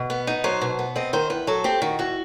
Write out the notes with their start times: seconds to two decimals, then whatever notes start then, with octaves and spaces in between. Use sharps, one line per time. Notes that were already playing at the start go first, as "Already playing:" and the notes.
Already playing: B2 D#5
0.10 B3
0.27 D#4
0.44 F#3 C5
0.61 B2
0.79 B3
0.96 C4 D#5
1.13 D#3 C5
1.30 E2 B4
1.47 F#3 A4
1.64 C4 G4
1.82 D#3 F#4
1.99 E2 F#4